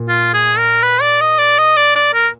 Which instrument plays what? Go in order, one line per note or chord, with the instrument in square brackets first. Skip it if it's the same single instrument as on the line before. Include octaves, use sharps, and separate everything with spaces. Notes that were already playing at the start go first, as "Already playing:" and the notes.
Already playing: [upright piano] A#2
[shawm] F4
G#4
A#4
B4
D5
D#5
D5
D#5
D5
D5
A#4